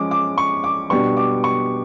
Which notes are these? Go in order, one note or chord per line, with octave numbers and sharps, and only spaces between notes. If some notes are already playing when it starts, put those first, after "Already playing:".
Already playing: F3 G#3 C#4 D6
D6
C#6
D6
B2 G3 B3 D4 C#6
D6
C#6